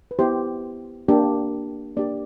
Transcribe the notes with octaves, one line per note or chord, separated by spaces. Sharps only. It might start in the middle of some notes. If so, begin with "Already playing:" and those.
B4
B3 E4 G4 C5
A#3 D4 G4
A#3 D4 G4 D5